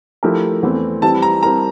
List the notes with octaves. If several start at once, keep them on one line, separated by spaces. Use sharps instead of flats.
F3 A3 E4 G4 A#4
E2 E3 A3 C4
E3 G3 C4 E4 G4 A5
A#5
G3 C4 E4 A#4 A#5